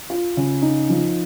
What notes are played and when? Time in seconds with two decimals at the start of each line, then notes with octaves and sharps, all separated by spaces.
0.10 F4
0.37 C#3
0.62 D#4
0.90 F3